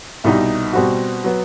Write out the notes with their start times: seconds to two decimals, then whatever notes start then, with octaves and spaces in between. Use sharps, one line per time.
0.24 C2 B2 G3 D#4
0.73 B2 G3 C4 F#4
1.24 F#3 B3